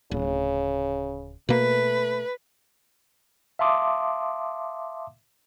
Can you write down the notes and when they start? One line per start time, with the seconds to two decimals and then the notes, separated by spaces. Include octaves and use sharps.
0.11 D1 C#3
1.49 B2 A3 A#3 B4
3.59 E5 F5 A5 C6 D6 D#6